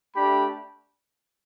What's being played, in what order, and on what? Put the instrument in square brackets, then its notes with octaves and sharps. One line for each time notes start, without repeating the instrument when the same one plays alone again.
[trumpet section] A3 D4 G4 B5